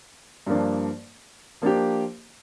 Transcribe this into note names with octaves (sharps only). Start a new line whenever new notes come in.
G2 F3 A#3 D4
F3 A#3 D4 G4